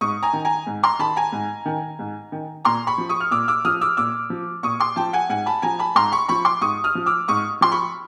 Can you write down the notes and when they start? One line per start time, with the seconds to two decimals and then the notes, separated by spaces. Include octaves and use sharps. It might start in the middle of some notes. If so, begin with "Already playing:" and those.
0.01 G#2 C#6 D#6
0.23 G#5 A#5
0.33 D#3
0.45 G#5 A#5
0.67 G#2
0.83 A#5 C6
0.99 D#3 A5 B5
1.16 G#5 A#5
1.32 G#2
1.65 D#3
1.99 G#2
2.32 D#3
2.65 A#2 A#5 C6
2.87 B5 C#6
2.98 F3
3.09 C#6 D#6
3.20 F6
3.31 A#2 D6 E6
3.48 D6 E6
3.65 F3 D#6 F6
3.81 D6 E6
3.97 A#2 D6 E6
4.30 F3
4.63 A#2 C#6 D#6
4.80 C6 D6
4.96 F3 G5 A5
5.13 F#5 G#5
5.30 G#2 F#5 G#5
5.46 A5 B5
5.62 F3 G#5 A#5
5.79 A5 B5
5.95 G#2 A#5 C6
6.12 B5 C#6
6.29 F3 B5 C#6
6.45 C6 D6
6.61 G#2 C#6 D#6
6.84 D#6 F6
6.95 F3
7.06 D6 E6
7.28 G#2 C#6 D#6
7.61 F3 C6
7.72 B5 C#6